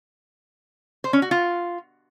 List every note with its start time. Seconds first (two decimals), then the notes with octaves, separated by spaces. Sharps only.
1.04 C5
1.13 C#4
1.22 F#4
1.31 F4